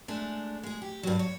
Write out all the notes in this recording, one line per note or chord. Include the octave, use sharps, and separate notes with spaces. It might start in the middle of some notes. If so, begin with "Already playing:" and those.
G#3 A3 D4
G#3 G#4
G4
G2 F#3
C#5